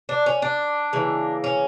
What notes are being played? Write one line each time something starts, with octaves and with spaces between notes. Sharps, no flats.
D4
C#4
D4
C#3 E3 A#3
C#4